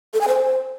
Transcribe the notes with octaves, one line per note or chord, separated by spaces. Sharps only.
A4
G#5
C5